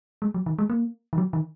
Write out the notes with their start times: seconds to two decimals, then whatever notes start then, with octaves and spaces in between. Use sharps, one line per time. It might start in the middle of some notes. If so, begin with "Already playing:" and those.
0.22 G#3
0.34 F#3
0.46 D#3
0.59 G#3
0.70 A#3
1.13 D#3
1.18 F#3
1.33 D#3